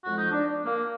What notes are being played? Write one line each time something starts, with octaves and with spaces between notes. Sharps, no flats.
F2 F3 G#3 F#4
D#4
D4
A#3